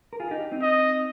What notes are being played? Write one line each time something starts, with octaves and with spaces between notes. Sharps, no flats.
A#4
F4 G#4
D#4 G4
C4 D#4
D#5